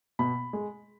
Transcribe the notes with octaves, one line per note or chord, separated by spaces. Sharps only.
B2 B5
G#3